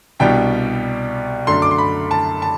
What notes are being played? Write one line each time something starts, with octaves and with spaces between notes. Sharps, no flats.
C2 B2 G3 D4 G5
F#2 D3 A3 D4 C6
D6
C6
B5
A5
A5